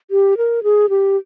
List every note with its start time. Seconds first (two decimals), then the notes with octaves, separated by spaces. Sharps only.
0.11 G4
0.37 A#4
0.63 G#4
0.89 G4